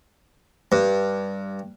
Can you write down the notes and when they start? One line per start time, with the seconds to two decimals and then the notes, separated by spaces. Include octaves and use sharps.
0.72 G2